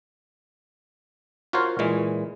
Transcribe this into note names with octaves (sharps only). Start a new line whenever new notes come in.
F4 F#4 A#4 C5 C#5 F5
A#2 E3 G#3